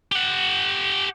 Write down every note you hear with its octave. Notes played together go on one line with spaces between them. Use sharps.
G4 F#5